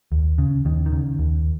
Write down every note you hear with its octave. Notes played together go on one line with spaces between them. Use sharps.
D#2
C#3
D#2 D#3
D#3
C#3
D#2